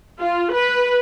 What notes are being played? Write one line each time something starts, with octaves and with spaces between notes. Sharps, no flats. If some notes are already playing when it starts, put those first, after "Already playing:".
F4
B4